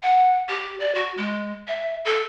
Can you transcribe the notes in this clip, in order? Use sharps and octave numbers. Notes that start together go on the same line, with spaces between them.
F#5
G4
D5
F#4
G#3
E5
A4